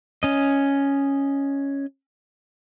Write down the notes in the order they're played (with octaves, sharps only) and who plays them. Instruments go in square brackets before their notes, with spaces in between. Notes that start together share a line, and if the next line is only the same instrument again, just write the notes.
[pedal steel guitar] C#4 D#5